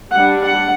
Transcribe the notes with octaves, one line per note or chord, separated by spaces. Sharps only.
G3 D4 F#5
F#5